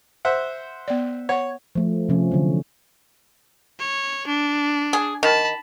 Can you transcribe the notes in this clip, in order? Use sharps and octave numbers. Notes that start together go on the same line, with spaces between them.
C5 E5 F#5
B3 D5
C#5 F#5
F3 A3
C3 F3 C#4
D3 F#3
C#5
D4
G#4
D#3 A5 B5